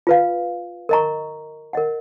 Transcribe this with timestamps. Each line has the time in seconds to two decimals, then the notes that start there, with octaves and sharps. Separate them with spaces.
0.07 F4 B4 F5
0.89 A#4 D#5 A#5 C#6
1.73 A#4 D#5 F#5